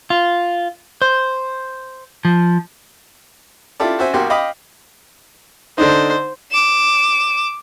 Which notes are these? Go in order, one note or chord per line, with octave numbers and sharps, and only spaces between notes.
F4
C5
F3
E4 F4 G4 A4 D5
F#4 C5 E5 G#5
B1 A#3 F#4 G4 C6
D#5 F5 G5 B5 D6 D#6
D3 D4 D#4 C5
D6 E7